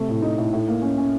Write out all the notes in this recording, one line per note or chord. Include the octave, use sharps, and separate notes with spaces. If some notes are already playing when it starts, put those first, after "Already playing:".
Already playing: C3 A3
A2
D#4
A2
A2
A#3
C#4
C#4